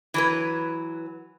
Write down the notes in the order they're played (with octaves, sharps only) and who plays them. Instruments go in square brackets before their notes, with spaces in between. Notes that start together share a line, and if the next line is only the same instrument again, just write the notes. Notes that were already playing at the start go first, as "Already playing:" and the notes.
[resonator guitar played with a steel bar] E3 F#3 B4